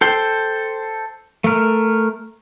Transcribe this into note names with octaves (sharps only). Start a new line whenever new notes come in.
A4 C5 G5
A3 A#4